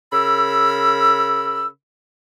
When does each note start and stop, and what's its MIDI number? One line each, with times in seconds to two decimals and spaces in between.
0.13 1.67 49
0.13 1.67 70
0.13 1.67 83
0.13 1.67 88